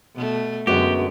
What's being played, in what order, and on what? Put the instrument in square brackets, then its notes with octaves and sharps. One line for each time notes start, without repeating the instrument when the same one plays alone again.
[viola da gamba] B2 A3
[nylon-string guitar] F#2 B3 F#4 [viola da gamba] D3 G#3 [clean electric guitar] G4